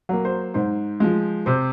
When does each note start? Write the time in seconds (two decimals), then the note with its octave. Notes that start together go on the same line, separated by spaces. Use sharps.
0.09 F#3 A#3
0.25 C5
0.54 G#2 C5
1.00 F3 G#3
1.46 C3 C5